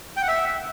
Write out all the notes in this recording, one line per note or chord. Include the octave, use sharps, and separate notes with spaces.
G5
F#5
E5